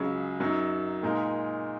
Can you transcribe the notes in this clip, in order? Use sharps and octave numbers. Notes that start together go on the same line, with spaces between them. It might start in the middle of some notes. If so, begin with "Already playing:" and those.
Already playing: C#2 C#3 F#3 C#4 G#4
F#2 F#3 D#4
A#2 G#3 D#4 A#4